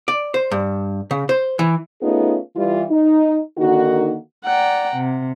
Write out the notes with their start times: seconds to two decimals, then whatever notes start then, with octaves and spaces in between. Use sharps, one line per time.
0.08 D5
0.34 C5
0.51 G2
1.11 C#3
1.29 C5
1.59 E3
2.02 A3 B3 C#4 D#4 F4 G#4
2.56 E3 G3 F4
2.90 D#4
3.58 D3 D#3 A#3 D#4 F#4
4.46 D5 F#5 G5 A#5
4.97 C3